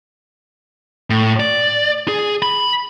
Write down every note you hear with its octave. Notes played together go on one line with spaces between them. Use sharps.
A2
D5
G#4
B5